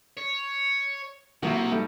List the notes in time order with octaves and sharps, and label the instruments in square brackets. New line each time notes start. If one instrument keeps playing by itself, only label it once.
[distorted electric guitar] C#5
[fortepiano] B1 E4 [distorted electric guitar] C3 [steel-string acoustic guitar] A#3 F#4
[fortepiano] G#2 G3 A3